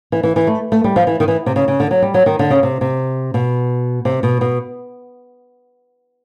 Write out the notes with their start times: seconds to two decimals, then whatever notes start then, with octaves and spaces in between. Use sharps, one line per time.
0.12 E3
0.24 E3
0.36 E3
0.47 A3
0.72 A3
0.84 G3
0.96 F3
1.07 E3
1.20 D#3
1.28 E3
1.46 C3
1.56 C#3
1.68 C#3
1.80 D3
1.91 F#3
2.02 G3
2.14 F#3
2.26 D#3
2.39 D3
2.50 C#3
2.63 C3
2.81 C3
3.34 B2
4.05 C3
4.23 B2
4.41 B2